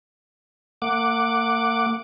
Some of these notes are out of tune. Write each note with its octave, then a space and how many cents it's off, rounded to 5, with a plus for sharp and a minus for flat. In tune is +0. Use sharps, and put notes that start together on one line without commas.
A#3 -40 F#5 +0 D6 +0